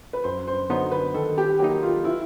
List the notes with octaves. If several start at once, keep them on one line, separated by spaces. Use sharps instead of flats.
B4
F#2 C5
C5
D3 F#3 B3 D#4 C5
B4
D#3 A4
G4
F#3 A#3 D#4 G4
F4
E3 E4